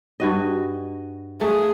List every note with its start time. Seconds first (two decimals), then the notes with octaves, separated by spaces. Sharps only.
0.20 G2 F#4 D#5
1.41 A3 G#4